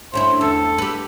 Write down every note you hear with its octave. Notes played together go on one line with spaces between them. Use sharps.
D2 C#4 E4 C5
E2 A4
G4 B4